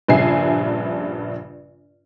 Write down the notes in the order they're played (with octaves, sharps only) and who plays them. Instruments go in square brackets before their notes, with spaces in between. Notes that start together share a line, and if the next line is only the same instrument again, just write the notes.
[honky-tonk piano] A#1 G2 C#3 E5 G#5 C7